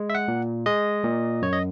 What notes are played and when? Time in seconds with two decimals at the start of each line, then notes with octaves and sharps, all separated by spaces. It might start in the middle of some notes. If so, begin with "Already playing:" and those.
Already playing: G#3
0.10 E5
0.15 F#5
0.28 A#2
0.66 G#3 D#5
1.04 A#2
1.42 F#2 C#5
1.53 D#5